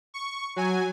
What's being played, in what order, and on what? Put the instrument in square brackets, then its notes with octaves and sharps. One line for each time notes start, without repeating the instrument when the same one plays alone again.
[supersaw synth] C#6
F#3 G#5